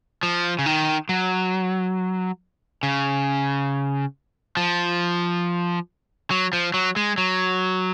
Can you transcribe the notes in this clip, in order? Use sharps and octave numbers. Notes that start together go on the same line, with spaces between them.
F3
C#3
D#3
F#3
C#3
F3
F#3
F3
F#3
G#3
F#3